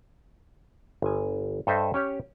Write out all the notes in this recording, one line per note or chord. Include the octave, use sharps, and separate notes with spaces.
G1 G#5
G2 A4 C5 D#5 E5
C#4 G4 C#5